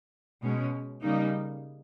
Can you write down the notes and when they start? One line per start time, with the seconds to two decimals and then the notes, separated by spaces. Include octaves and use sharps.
0.43 B2 G#3 C#4
1.02 C#3 G3 A#3 D#4